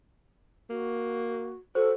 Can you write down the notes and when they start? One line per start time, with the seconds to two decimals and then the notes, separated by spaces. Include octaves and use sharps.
0.70 A#3 F#4
1.75 F#4 A4 C5